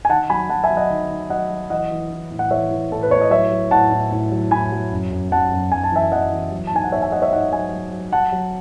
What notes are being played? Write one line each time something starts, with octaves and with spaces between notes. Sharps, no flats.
G#5
D#3 F#5 A5
F#3 G#5 B5
F#3 F#5 A5
E5 G#5
F#3
D#5 F#5
D#3
D#3
F#3 D#5 F#5
F#3
E3 D#5 F#5
E3
E3
A2
F#5
E3 C#5 E5
E3
A2 A4
B4
A2 C#5
D#5
F#3 C#5 E5
F#3
A2 F#5 A5
A2
A2
F#3
A2 G#5 B5
F#3
F#2
F#2
F#2 F#5 A5
F#2
F#2 G#5
A5
E3 E5 G#5
E3 D#5 F#5
E3
F#3
A5
G#2 G#5
F#5
G#2 C#5 E5
E5 G#5
F#3 D#5 F#5
C#5 E5
G#2 D#5 F#5
F#3 E5 G#5
F#3
F#3
F#3 F#5 A5
F#3